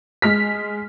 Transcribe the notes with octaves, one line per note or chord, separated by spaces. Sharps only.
G#3 F6 B6